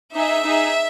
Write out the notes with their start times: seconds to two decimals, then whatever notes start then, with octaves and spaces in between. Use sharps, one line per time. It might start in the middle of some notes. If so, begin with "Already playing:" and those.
0.15 D#4 G#4 E5
0.43 D#4 G#4